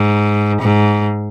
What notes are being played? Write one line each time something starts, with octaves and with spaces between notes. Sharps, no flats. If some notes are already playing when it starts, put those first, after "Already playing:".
Already playing: G#2
G#2